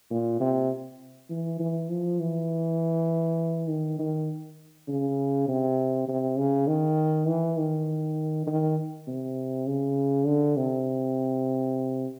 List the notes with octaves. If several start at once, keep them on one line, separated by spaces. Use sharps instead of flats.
A#2
C3
E3
E3
F3
E3
D#3
D#3
C#3
C3
C3
C#3
D#3
E3
D#3
D#3
C3
C#3
D3
C3